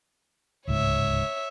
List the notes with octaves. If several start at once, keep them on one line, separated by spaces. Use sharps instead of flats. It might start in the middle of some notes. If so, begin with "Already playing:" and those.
D1 C#2 G#2 C#5 E5